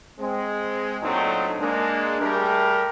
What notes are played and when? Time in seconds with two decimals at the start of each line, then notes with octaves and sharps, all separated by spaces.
0.19 G#3 C4
1.02 A#2 F#3 A3 C4 D4 D#4
1.59 G#3 A#3 D4
2.21 G3 A3 G4 G#4 A#4